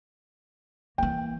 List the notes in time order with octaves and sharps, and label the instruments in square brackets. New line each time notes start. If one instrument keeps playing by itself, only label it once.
[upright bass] E3 A#3 [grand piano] G5